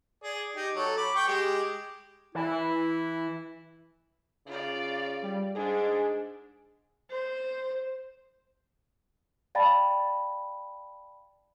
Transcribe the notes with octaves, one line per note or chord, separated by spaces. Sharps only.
G#4 D5
D#4 G4
F#3 A4
B5 D6
G5 C#6
G#3 G4
E3 E4
C#3 F4 D5
G3
G#2 D4 G#4
C5
D5 F5 G5 A5 B5 A6